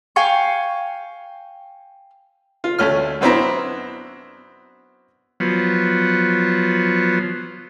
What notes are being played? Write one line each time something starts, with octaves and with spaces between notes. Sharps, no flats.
F5 G5 G#5 C#6
F4
D2 A3 C#4 F6
F#2 B3 C4 D4 E4 A#5
F3 F#3 B3